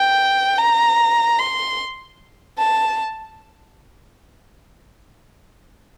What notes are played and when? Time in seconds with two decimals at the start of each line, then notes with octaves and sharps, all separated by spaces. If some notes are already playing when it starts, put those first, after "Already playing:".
Already playing: G5
0.58 A#5
1.39 C6
2.58 A5